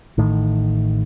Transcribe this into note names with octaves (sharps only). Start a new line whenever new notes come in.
A1 A2 D#3